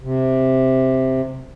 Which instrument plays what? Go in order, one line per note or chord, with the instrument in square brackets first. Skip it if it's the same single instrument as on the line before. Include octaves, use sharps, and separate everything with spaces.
[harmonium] C3